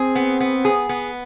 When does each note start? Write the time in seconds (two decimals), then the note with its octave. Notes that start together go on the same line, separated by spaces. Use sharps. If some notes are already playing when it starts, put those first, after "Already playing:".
Already playing: C4 G#4
0.15 B3
0.40 B3
0.65 G#4
0.89 B3